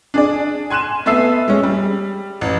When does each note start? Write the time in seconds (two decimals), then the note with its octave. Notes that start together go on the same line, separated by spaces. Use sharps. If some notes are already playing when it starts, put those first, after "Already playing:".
0.14 D4 G#4 D5
0.70 G#5 C6 F#6 D#7 E7
1.06 A3 B3 A4 E5 E6 C7
1.48 G#3 C#4
1.63 G3
2.41 A1